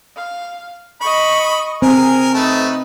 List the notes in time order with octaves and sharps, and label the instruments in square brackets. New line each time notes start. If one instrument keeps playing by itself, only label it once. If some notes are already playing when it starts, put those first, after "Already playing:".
[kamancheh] F5
[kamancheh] D#5 C#6 [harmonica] B5
[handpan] C4 [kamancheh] G#4 [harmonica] A#4 G#5
[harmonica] A3 A5 [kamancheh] D#4 B4